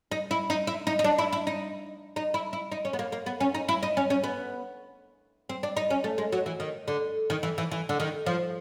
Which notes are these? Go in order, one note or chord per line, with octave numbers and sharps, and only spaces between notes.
D#4
E4
D#4
E4
D#4
D#4
D4
E4
E4
D#4
D#4
E4
E4
D#4
C#4
B3
A#3
A#3
B3
C#4
D#4
E4
D#4
C#4
C#4
B3
C4
D4
D#4
C#4
A3
G#3
F#3
E3
D#3
D3
D#3
E3
E3
E3
D3
D#3
F3